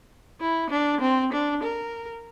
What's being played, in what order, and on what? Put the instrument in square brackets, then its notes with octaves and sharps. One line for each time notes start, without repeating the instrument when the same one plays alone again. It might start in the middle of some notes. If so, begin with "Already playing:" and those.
[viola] E4
D4
C4
D4
A#4